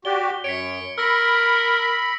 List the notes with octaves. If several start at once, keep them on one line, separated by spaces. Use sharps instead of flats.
F#4 G4 D5 G7
F#2 C#5 B6 C#7 D7
A#4 B5 E6 A#6